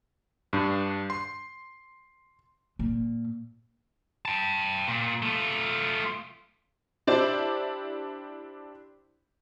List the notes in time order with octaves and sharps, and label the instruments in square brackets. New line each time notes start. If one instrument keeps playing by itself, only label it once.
[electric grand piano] G2 D4
C6
[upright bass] A#2
[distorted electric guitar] G5 A5
A#2
A3 F4
[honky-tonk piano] D4 E4 G4 C5 D5